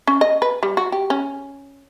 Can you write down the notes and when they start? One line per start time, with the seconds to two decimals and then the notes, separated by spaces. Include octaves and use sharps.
0.07 C#4
0.21 D#5
0.42 B4
0.63 G3
0.77 F#4
0.92 G4
1.10 C#4